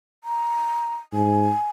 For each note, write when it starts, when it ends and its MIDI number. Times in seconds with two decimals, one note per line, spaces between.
0.24 0.96 82
1.13 1.50 44
1.13 1.70 80